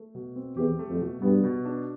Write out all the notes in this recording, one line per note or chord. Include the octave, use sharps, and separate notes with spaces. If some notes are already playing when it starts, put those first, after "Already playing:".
Already playing: A3
B2
C4
E2 G4
A3
F2
B2
G2 B3
B2
D4